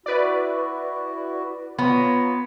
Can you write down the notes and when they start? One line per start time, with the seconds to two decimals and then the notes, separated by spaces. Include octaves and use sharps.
0.06 E4 F#4 B4 D5
1.79 B3 F4 C#5 A#5